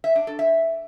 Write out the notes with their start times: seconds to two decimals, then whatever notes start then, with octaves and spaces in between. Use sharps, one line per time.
0.04 E5
0.16 D4
0.27 A4
0.39 E5